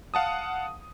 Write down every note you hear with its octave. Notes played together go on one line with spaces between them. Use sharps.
F5 F#5 A5 D#6